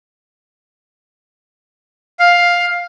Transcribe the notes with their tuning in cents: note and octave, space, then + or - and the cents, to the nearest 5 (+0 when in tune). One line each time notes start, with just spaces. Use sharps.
F5 +10